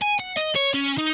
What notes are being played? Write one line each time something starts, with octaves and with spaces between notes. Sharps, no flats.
G#5
F#5
D#5
C#5
C#4
D#4